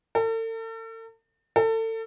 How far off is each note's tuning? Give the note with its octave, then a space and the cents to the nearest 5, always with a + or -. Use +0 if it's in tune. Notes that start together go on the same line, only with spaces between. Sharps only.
A4 +40
A4 +30